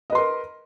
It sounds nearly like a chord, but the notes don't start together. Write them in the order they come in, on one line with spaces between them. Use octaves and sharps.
D#5 B4 C6 A#4